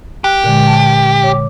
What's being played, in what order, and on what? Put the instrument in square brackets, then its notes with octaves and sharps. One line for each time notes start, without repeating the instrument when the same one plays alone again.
[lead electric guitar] G4 [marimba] F#6
[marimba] A#2 D3 G#3
A5
C#5 D6